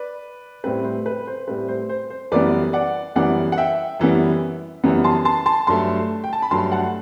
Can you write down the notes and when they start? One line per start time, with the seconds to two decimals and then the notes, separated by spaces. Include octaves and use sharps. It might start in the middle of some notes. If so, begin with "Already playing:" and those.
Already playing: B4 D5
0.64 A2 G3 C4 B4
0.85 C5
1.06 B4
1.27 C5
1.48 A2 G3 C4 B4
1.68 C5
1.89 C5
2.10 C5
2.32 F#2 E3 G3 B3 B4 D5
2.73 D5 F#5
3.16 F#2 E3 G3 B3 D5 F#5
3.52 F#5
3.58 E5 G5
4.00 F#2 E3 G3 B3
4.84 F#2 E3 G3 B3
5.04 A5 C6
5.25 A5 C6
5.46 A5 C6
5.67 G2 F#3 A3 A5 C6
6.24 G5
6.33 A5
6.42 B5
6.51 G2 F#3 A3 A5 C6
6.72 F#5 A5